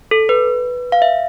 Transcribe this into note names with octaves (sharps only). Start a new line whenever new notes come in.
A4
B4
F5
E5